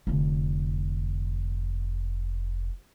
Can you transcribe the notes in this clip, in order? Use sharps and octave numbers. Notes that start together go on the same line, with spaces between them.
F1 D3